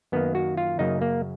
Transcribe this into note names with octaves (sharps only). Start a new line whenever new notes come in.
F#2 D#3 A#3 B3
F#4
F4
F#2 C#3 F#3 A#3 D#4
A#3